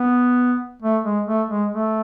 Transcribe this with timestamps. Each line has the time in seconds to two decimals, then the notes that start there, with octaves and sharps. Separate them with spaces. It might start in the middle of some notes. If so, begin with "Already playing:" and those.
Already playing: B3
0.82 A3
1.04 G#3
1.27 A3
1.50 G#3
1.73 A3